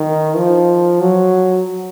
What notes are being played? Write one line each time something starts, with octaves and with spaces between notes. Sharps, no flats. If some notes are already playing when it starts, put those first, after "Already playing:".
Already playing: D#3
F3
F#3